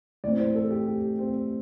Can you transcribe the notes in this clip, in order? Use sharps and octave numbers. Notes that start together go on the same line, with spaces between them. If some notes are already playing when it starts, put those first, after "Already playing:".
A2 E3 C4 D5
C5
A4
G4
G4
C4